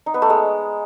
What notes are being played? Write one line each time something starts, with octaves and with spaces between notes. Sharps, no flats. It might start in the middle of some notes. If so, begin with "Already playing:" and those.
D#4
B3
A3
G#3